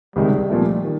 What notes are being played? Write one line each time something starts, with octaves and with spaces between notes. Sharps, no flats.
C#2 C3 D#3 G3 G#3
A#2 F3 A3
D#3